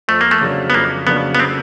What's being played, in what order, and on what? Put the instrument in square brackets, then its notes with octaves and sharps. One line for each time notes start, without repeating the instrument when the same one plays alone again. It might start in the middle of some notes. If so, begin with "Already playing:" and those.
[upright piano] F2 [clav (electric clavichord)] A3
[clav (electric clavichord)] A#3
A3
[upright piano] C#3 F#3 A#3 D4
[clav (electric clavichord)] B3
[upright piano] F2 [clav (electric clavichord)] A#3
[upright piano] C#3 F#3 A#3 D4 [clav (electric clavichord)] B3
[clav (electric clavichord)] B3
C4